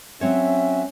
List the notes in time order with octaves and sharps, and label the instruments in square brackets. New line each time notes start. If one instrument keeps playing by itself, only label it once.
[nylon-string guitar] F#3 C4 C#5 [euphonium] C#4 [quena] E5